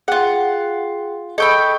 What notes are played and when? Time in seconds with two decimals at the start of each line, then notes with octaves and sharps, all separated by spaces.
0.08 F4 G#4 F#5 G5
1.38 A4 D#5 G5 B5 C#6 E6